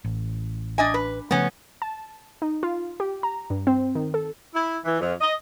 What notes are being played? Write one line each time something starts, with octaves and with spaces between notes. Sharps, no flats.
A1
D4 D#5 G#5
B4
C#3 F3 A3 B3 C#4
A5
D#4
F4
G4
A#5
G2
C4
D#3
A4
E4
E3
F2
D#5